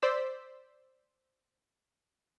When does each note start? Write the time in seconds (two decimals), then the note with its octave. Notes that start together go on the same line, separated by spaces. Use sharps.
0.02 C5 D5 E6 B6